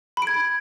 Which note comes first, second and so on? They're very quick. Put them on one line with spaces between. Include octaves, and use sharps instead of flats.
B5 D7 G#6